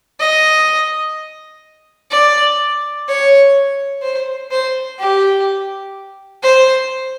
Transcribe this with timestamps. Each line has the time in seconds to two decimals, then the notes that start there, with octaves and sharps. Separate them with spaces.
0.20 D#5
2.11 D5
3.08 C#5
4.03 C5
4.51 C5
5.00 G4
6.43 C5